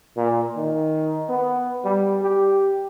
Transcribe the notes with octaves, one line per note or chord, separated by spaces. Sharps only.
A#2
D#3
B3
G3
G4